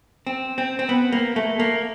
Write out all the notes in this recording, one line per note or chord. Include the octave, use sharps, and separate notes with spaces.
C4
C4
C4
B3
A#3
A3
A#3